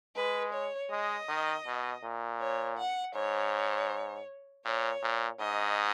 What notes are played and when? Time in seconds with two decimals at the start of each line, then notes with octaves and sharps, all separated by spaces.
0.16 G#3 B4
0.53 C#5
0.91 G#3 D#5
1.29 D#3
1.67 B2
2.03 A#2
2.41 C#5
2.78 F#5
3.15 G#2 C#5
4.65 A#2 C#5
5.02 A#2
5.40 G#2 D#5